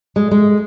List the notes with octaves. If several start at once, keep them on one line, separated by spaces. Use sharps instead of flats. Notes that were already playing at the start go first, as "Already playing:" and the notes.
G#3
G#3